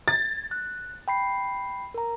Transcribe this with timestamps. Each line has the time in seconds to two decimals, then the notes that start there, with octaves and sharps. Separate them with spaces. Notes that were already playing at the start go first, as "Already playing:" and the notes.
0.08 G#6 A6
0.51 F#6
1.08 G5 B5 C7
1.94 A#4 A#5